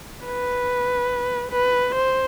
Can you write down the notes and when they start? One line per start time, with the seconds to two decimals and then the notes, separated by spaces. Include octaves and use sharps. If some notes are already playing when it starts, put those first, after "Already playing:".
0.26 B4
1.52 B4
1.95 C5